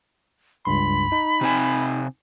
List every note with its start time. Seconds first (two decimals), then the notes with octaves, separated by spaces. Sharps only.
0.65 C#2 G2 B5 C6
1.12 D#4
1.41 C3 C4 G#5